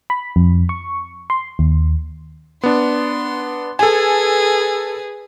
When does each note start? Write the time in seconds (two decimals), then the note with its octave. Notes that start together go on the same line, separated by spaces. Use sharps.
0.10 B5
0.36 F2
0.69 C#6
1.30 C6
1.59 D#2
2.63 B3 D4 C6
3.79 G#4 A4 B4 G#5